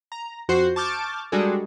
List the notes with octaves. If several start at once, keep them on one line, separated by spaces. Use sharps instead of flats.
A#5
F2 F#4 C5 C7
A5 C#6 D6 F6 G6 A6
G3 G#3 D4 F#4 G#4 A4